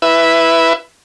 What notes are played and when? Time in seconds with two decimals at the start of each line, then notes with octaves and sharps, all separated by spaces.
0.02 E4 B4 E5